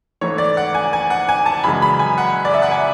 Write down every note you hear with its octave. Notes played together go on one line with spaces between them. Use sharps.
G#2 E3 A3 C#5
D5
F#5
G#5
G#5
F#5
G#5
A5
F#2 C#3 E3 G#3 B5
B5
G#5
F#5
D5
E5
F#5
G#5